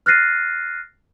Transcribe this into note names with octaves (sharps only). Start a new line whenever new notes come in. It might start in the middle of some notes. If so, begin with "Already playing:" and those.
F6 F#6 A6 A#6 C7 D#7